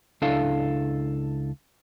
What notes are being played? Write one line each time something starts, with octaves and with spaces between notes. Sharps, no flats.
C#2 D4 E4 A4 F5